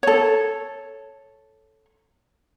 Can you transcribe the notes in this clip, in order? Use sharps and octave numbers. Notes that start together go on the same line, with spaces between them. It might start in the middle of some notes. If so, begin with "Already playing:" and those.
A4 C#5